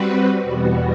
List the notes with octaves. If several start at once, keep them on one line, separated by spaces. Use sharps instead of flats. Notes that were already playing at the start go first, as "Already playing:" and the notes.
Already playing: G3 C4 F#4 B4
E2 B2 G3 B3 F#4